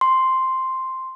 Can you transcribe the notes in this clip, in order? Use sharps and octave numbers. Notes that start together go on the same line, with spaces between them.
C6